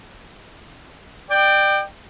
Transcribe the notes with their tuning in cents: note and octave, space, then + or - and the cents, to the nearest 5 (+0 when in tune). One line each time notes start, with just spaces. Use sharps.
D5 +35 G5 +0